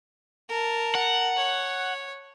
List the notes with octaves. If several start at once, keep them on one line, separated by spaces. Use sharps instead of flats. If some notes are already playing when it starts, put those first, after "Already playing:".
A#4 A5
F#5
C#5